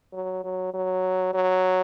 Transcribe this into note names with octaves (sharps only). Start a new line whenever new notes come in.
F#3
F#3
F#3
F#3